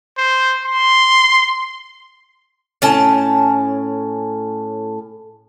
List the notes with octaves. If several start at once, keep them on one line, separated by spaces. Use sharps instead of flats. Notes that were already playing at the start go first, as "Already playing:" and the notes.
C5
C6
A2 C#4 A5